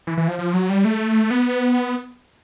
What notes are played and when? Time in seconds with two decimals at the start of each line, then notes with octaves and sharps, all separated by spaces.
0.07 E3
0.18 E3
0.28 F3
0.39 F3
0.53 F#3
0.69 G3
0.85 A3
1.31 B3